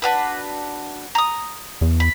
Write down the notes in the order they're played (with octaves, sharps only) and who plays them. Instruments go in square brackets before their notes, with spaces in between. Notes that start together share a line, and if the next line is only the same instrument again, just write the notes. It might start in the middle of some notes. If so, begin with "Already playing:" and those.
[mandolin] D4 F#4 B4
A#5 D#6
[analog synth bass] E2
[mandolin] B5